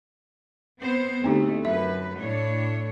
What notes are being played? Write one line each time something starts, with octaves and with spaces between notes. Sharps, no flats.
B3 C4 C5
D2 A3 C4 D#4 G4
F#2 B4 E5
A2 D4 C#5